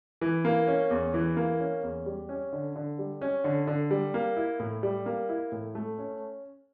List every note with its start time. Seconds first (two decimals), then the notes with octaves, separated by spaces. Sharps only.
0.21 E3
0.45 A#3
0.67 C#4
0.90 E2
1.14 E3
1.37 A#3
1.60 C#4
1.83 E2
2.06 G3
2.29 C#4
2.53 D3
2.76 D3
2.99 G3
3.21 C#4
3.44 D3
3.67 D3
3.91 G3
4.14 A#3
4.37 E4
4.59 A2
4.83 G3
5.06 A#3
5.29 E4
5.52 A2
5.75 A3
5.98 C#4